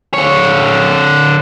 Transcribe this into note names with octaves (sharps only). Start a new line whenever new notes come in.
D3 C#5